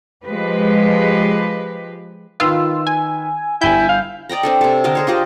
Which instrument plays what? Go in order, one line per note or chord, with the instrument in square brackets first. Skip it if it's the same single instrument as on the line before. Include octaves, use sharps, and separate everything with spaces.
[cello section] F3 G#3 G4 B4
[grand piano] D#3 B4 E6 [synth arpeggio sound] F4
[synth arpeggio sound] G#5
[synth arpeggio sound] G1 G2 G6 [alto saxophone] E4 [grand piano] G5 G#5
[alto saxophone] F5
[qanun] D5 D#5 G5 A#5
C4 D4 A4
C3 A4
D3 A#4 D#5 A5
G#4 C5 C#5
D4 F4 G4 D#5